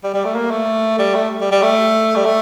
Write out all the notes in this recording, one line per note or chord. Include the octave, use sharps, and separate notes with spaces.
G3
G3
A3
A#3
A3
G3
A3
G3
G3
A3
G3
A3